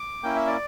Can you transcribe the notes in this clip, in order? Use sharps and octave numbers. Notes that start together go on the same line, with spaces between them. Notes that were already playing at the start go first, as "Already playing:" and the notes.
Already playing: D6
A#3 C#4 E4 G5
E5
D5